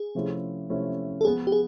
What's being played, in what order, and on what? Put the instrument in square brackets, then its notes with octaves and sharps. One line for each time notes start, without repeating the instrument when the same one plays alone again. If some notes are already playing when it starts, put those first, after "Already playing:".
Already playing: [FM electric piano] G#4
[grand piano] C3 F3 A3 C#4 E4
C3 F3 A3 C#4 E4
[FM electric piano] A4
[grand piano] F3 G#3 B3 [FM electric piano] G#4
[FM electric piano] G4
G#4